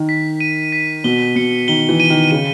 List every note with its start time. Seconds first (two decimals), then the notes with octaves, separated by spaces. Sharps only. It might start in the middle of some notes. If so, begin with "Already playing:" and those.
Already playing: D#3
0.09 B6
0.40 D#7
0.72 B6
1.04 B2 G7
1.35 B2 C#7
1.68 D#3 G7
1.89 E3
2.00 D#7
2.10 D#3
2.31 C#3 D#7